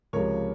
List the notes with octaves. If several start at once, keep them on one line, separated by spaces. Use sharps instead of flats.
C#2 C3 F3 G#3 A#4 C#5